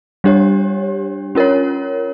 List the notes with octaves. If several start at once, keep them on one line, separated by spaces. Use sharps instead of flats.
G3 D4 G4 C#5
C#4 F4 A#4 C#5